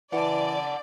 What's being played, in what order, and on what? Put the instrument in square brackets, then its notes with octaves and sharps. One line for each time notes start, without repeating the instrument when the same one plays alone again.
[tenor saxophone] E3 [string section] D5 [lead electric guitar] F#5 A5